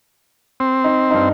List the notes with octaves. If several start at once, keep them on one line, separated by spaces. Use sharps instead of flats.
C4
D#4
G2 D#4